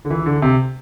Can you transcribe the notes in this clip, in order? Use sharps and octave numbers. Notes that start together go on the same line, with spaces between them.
D3
E3
D3
C3